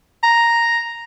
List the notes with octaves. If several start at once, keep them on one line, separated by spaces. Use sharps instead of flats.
A#5